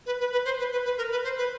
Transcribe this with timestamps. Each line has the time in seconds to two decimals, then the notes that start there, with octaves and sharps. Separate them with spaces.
0.06 B4
0.20 B4
0.32 B4
0.45 C5
0.59 B4
0.72 B4
0.85 B4
0.98 A#4
1.11 B4
1.24 C5
1.37 B4